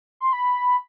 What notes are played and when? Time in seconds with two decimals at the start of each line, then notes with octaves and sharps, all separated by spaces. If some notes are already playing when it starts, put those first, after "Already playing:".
0.20 C6
0.33 B5